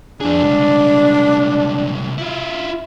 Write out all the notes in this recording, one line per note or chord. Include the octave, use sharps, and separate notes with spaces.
F2 D4 G#4
C2 G#3
E4 F4